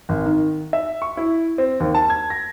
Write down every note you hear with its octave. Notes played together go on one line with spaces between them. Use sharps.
G#1
D#3
E5
C#6
E4
C4
D#2
A5
G#6
A#6